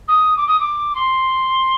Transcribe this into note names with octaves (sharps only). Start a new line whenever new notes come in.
D#6
D6
D#6
D6
C6